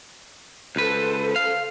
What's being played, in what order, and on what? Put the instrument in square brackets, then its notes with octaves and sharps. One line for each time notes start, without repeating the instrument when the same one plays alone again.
[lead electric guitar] C#2 B4 [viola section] A4 C5
[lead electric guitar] F5